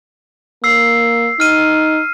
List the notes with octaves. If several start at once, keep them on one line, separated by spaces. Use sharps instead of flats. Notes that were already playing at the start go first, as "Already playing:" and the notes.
A#3 E6 C7
D#4 F6 D#7